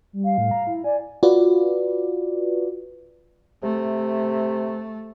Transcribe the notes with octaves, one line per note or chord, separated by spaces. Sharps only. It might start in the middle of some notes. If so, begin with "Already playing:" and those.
G3
F5
A2
A#5
E4
D5 G#5
F4 F#4 B4 D5
C3 A3